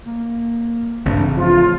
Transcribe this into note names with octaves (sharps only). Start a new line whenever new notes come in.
A#3
A1 G2 C#3 C4
F3 F4